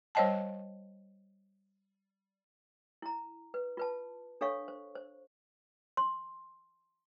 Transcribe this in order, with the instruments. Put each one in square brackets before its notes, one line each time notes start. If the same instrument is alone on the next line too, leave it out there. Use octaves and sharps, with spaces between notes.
[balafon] G3 C5 C#5 D#5 G5 A5
[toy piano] E4 A#5
B4
F4 B4 A5
D4 A4 C#5 F5 C#6
C5
C5
C6